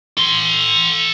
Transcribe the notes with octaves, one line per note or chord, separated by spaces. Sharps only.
A4 C6